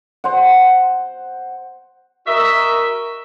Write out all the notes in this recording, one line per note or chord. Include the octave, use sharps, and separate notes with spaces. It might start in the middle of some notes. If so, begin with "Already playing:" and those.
C5 F#5
F#4 A#4 D#5 E5